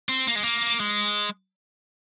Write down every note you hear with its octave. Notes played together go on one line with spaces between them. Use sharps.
C4
A#3
G#3
A#3
G#3